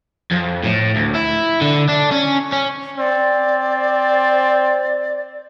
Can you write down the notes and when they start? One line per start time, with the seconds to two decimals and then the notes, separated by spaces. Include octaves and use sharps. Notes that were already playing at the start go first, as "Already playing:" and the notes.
0.31 F2
0.64 A2
0.96 D2
1.15 E4
1.61 D3
1.88 D4
2.11 C#4
2.52 C#4
2.98 C4 D5